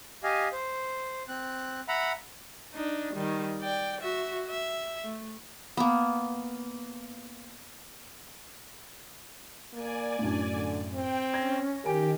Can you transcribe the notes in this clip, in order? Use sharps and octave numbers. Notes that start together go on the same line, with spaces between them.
G4 D#5 F5 G#5
C5
C4 F#6
E5 F#5 A#5 B5
D4 D#4
D#3 G3
D5 G5
F#4 E5
E5
A3
A#3 B3
A#3 D5 G#5
F#2 A2 D4
D3
C4 G5
C#4 G#6 A#6
D#3 G4 A#4 G#5 D7